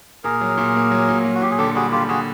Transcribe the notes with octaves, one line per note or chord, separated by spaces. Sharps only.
A#2 G#4 A#4
F#3
A#2
A#3
F#3
A#2
F#3
F#4
A#2 G4
G#4
D3 G4 A4
G3 F#4 G#4
D3 F4 G4
D3 F#4 G#4